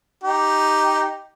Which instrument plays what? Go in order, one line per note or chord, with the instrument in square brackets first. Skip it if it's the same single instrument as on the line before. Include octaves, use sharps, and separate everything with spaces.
[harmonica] D#4 G4